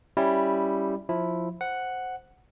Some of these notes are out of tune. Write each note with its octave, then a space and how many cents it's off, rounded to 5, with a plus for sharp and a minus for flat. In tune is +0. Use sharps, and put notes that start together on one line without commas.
G3 +0 C#4 +0 E4 +0
F3 +10 E4 +0
C5 +0 F#5 +0